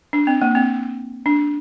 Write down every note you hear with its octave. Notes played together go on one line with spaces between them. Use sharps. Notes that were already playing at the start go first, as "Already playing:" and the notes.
D4
C4
A#3
C4
D4